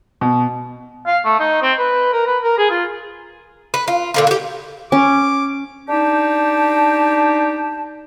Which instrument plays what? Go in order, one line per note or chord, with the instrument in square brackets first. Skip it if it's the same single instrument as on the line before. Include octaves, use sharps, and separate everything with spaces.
[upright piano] B2
[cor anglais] F5
A3
D#4
C4
B4
A#4
B4
A#4
G#4
F4
[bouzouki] B4
F4
A#2 D3 F4
F#4 G4
[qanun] C#4 [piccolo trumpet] D6
[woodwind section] D4 D#4 G4 A5